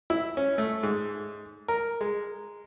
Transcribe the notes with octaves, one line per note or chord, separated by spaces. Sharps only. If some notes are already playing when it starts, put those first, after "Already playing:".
E4
C#4
A3
G#2
A#4
G#3